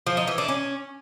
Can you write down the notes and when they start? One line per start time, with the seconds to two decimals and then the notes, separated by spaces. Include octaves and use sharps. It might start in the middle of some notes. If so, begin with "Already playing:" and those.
0.07 F3
0.17 D#4
0.27 E3
0.38 D4
0.48 C#4